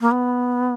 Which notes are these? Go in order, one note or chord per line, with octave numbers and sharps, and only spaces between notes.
A#3
B3